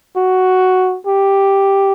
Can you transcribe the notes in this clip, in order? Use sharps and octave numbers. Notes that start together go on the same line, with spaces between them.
F#4
G4